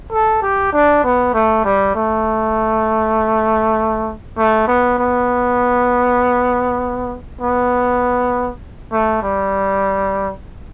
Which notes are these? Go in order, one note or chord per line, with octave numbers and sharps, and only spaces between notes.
A4
G4
D4
B3
A3
G3
A3
A3
B3
B3
B3
A3
G3